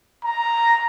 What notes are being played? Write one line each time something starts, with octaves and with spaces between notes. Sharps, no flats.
A#5